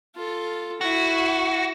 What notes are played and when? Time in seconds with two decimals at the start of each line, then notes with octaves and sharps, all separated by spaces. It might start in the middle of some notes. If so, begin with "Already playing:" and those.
0.16 F4 A4
0.81 E4 F#4